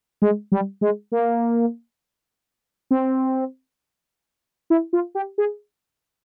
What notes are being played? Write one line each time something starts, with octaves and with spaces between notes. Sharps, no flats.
G#3
G3
G#3
A#3
C4
E4
F4
G4
G#4